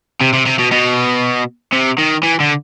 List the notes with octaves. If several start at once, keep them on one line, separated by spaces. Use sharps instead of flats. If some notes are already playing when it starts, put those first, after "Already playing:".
C3
C3
C3
B2
B2
C3
D#3
E3
D3